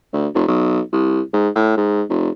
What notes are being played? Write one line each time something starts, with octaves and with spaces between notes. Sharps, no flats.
D2
F1
B1
C2
G#2
A2
G#2
F1